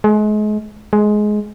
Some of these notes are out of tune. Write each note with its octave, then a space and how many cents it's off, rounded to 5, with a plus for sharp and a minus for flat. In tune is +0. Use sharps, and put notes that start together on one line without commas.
G#3 +35
G#3 +15